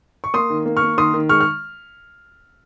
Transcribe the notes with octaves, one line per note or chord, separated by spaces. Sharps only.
C#6
A#3 C6 D#6
D#3
A#3
C#6 F6
A#3
D#3 C6 D#6
D#3
G#3 C#6 F6
F6